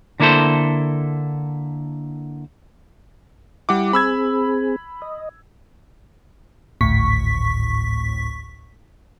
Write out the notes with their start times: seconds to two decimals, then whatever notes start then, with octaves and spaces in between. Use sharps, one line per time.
0.20 D3 A#3 E4 A4 C5
3.69 G3 E4 F#5 D6
3.93 C4 G#4 B5 E6 G#6
5.02 D#5
6.81 G#1 D2 A2 C#6 B6